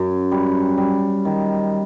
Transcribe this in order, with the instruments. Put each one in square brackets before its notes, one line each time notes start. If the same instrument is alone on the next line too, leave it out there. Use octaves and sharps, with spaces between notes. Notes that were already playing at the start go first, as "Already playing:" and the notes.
Already playing: [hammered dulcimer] F#2
G3
G3
D#3